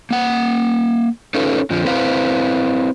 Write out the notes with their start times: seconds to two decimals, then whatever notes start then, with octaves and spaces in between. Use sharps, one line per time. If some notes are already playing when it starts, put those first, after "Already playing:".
0.11 A#3 F#5
1.34 C#4 D#4 F4 A4 B4
1.70 F2 D3 F3
1.85 C4 E4 B4 C5 F5